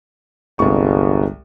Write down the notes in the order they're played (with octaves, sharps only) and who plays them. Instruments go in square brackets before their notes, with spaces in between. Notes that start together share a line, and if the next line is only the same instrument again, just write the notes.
[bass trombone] G1 [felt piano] C2 G#3 C#6